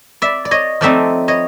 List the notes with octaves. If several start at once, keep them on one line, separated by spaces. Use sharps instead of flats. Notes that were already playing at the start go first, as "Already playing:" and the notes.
D5 E5
D5
C#5 D#5
F3 A3 C4 D#4 D5 E5
C#5 D#5